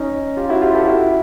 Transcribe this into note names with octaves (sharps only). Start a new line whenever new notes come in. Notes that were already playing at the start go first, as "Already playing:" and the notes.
Already playing: C#4 D#4
F4 G4
E4 F#4
F4 G4
G4 A4
E4 F#4